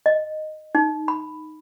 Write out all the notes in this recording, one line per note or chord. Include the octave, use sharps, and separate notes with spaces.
D#5
D#4
B5